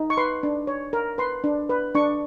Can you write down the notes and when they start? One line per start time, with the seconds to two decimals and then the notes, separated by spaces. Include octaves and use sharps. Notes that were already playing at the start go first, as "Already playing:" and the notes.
Already playing: D#4
0.10 C#6
0.17 B4 C6
0.43 D4
0.67 C#5
0.93 A#4
1.18 B4 C6
1.44 D4
1.70 B4
1.95 D4 C#6